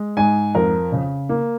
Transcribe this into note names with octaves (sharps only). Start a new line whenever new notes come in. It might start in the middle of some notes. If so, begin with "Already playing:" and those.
Already playing: G#3
G#2 G#5
F2 A#4
C#3
A#3